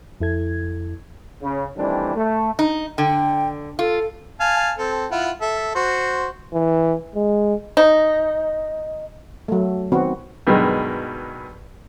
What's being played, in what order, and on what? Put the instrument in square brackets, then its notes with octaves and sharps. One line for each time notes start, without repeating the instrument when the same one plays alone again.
[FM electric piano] F2 E4 A4 G#6
[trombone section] C#3
D#3 E3 G3 A3 C4 D4
A3
[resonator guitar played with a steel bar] D#4
[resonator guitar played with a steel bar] D3 [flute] G5
[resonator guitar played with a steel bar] F4 [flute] A4
[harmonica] F5 G#5 A5
C4 A4
E4 F4 F#5
A4 E5
F#4 C5
[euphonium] E3
G#3
[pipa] D#4
[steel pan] F#3 A3
D#3 B3 C4 F#4
[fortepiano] G2 B2 D#3 F#3 G#3